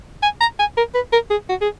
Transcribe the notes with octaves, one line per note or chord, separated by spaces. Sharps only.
G#5
A#5
G#5
A#4
B4
A#4
G#4
F#4
G#4